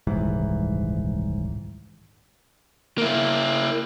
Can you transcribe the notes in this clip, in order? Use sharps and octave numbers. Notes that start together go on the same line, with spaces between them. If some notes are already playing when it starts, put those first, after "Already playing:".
D#1 C2 G#2 E3
A#3 E4